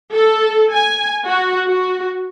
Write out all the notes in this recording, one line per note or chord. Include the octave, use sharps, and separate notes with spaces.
A4
G#5
F#4
F#4